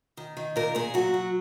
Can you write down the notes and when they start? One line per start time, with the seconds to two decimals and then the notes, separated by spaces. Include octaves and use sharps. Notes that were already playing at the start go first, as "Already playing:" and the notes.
0.17 D#3
0.37 D#3
0.56 A#2 A#4
0.75 A#2 G#4
0.94 F#3 F#4
1.14 F#3